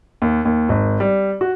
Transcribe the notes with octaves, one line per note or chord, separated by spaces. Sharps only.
D#2
D#2
G#1
G3
F#4